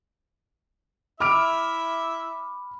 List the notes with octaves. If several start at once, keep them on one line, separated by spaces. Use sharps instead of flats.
E4 E5 B5 D6 F6 D7